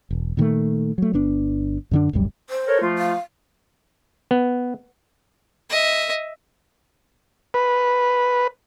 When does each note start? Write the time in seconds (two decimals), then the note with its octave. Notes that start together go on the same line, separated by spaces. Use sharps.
0.11 E1
0.37 A#2 D#3 F#3 A3
0.98 F#3 A3
1.13 G1 B3 D4
1.91 F#2 D3 D4
2.13 D1 A#1 F#2 G3
2.50 C5
2.67 A4 A#4 C#5
2.82 F3 A3 F4
2.98 F5
4.31 B3
5.69 D#5 E5
7.54 B4